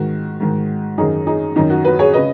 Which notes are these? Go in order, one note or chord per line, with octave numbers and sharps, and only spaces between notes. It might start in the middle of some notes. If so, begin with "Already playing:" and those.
Already playing: G#2 D#3 F#4
G#2 D#3
F#2 D#3 D#4 G#4
D#4 G#4
F#2 D#3 D#4
F#4
F#4 B4
G#4 C#5
C#3 B4 D#5